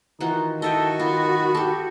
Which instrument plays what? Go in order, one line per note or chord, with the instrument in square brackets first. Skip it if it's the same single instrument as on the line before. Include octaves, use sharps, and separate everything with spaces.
[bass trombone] D#3 [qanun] E3 F4 F#4 [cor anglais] D#4
[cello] F#4 [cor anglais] A4 [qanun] D#5 E5 G5
[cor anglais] B3 [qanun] F4
[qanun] G4 A4